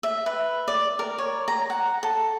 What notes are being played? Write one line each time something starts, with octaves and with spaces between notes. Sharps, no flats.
E5
B4
D5
A#4
C#5
A#5
F#5
A4